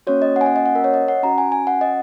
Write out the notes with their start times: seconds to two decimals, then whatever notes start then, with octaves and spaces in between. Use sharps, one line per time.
0.07 A#3 C#4 F#4 C#5
0.22 D#5
0.36 F#5
0.41 G#5
0.46 F#5
0.56 D#5
0.66 F#5
0.75 A#4
0.84 C#5
0.94 D#5
1.08 F#5
1.23 C#4 F#4 A#5
1.38 G#5
1.52 G#5
1.67 F#5
1.81 D#5